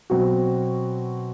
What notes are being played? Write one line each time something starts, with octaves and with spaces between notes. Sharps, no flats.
B2 F#3 C4 F#4